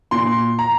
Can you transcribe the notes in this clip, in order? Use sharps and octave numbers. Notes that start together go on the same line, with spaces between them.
A#2 C6
A#5